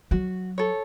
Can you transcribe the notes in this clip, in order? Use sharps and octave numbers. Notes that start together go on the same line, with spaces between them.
F#3 F#4
A4 C#5